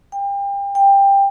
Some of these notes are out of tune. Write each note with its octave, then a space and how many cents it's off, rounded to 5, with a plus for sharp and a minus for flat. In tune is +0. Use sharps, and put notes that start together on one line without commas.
G5 +30
G5 +15